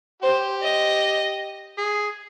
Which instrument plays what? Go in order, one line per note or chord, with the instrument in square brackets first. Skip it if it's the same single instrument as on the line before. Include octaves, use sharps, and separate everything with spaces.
[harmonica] G4 [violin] C5
[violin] D#5
[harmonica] G#4